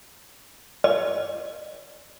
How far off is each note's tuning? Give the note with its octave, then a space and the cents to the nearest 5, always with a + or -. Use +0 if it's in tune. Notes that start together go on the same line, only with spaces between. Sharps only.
D#5 -35